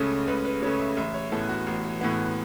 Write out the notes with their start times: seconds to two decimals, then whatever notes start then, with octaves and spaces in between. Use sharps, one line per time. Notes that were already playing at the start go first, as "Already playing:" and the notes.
Already playing: C#2 C#3 A3 C#4
0.27 C#2 B4
0.45 B4
0.62 C#3 A3 C#4 C#5
0.80 E5
0.97 A1 E5
1.14 C#5
1.32 A2 E3 B3 A4
1.49 F#4
1.67 A1
2.01 A2 E3 B3